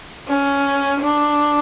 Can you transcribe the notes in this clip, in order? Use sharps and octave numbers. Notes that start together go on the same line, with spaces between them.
C#4
D4